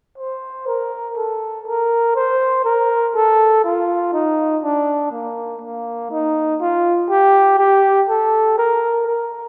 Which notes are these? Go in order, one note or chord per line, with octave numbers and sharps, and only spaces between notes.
C5
A#4
A4
A#4
C5
A#4
A4
F4
D#4
D4
A#3
A#3
D#4
F4
G4
G4
A4
A#4
A#4